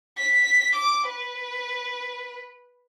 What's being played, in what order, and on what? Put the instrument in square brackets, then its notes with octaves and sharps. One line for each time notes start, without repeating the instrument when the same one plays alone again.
[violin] B6
D6
B4